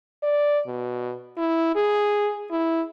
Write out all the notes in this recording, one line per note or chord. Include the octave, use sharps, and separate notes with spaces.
D5
B2
E4
G#4
E4